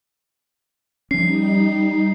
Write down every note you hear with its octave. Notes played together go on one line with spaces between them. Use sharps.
F3 G3 C#4 D#4 C7